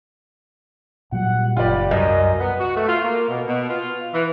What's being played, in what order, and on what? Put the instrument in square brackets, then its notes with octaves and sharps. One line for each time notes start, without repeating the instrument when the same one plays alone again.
[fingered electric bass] A#2 F#3 G3 [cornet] F#5
[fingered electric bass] F#1 [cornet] G3 [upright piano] F4 D5
[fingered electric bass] C2 [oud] F#2 [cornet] D#5
[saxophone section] B3
F#4
A3
F4
A#3
B2
B2
F4
E3